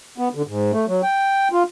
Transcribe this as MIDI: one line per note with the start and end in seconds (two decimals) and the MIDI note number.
0.18 0.29 59
0.35 0.42 50
0.47 0.72 44
0.72 0.86 57
0.88 1.02 54
1.03 1.48 79
1.52 1.63 65